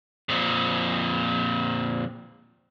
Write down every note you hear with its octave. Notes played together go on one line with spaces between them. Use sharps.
F2 A#2